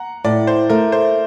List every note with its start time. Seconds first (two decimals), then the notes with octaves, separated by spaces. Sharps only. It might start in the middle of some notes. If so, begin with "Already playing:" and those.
Already playing: F#5 A#5
0.24 A2 D5
0.47 C5
0.69 A3 A#4
0.92 C5